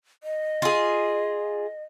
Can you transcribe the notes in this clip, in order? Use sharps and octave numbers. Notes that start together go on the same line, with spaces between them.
D#5
F4 G#4